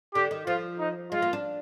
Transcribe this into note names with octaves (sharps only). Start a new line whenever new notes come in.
D3 G4
D#3
F3 F4
D#4
G#3 F4
A#3
D4